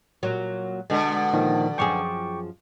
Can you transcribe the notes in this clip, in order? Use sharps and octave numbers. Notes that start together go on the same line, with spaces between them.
A#2 F#3
B2 D3 G#3
A#2 D#3 F3
F#2 F3 G#4 G5 C#6 D6